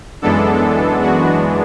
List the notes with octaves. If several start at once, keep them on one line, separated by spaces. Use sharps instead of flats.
F#2 E3 G#3 B3 D4 A4
F#4